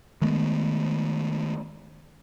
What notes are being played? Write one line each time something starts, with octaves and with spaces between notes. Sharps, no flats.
D#3 G#3 A3 B3